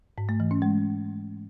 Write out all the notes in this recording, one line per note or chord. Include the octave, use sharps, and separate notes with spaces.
G#2
A3
E3
C#4
G#3